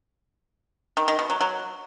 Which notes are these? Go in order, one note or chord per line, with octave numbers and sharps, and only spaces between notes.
D#3
D#3
B2
F#3
F#3